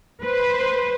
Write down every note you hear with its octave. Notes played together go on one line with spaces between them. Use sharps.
B4 C5